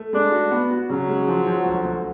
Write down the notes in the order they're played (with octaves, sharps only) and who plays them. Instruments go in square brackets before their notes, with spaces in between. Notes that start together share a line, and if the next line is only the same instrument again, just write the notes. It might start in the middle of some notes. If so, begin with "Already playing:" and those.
Already playing: [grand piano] A3
[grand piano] G#3 [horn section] D4
[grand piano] F#4
B3
F#4
[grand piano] C#3 [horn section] F#3
[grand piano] G#3
F3
F3
D2
D2